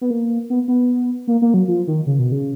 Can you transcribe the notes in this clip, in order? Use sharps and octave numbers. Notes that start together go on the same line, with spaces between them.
B3
A#3
B3
B3
A#3
A#3
F#3
F3
D#3
C#3
B2
C#3